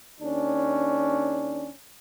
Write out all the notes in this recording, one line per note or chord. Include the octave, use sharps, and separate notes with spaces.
D#2 C#4 D4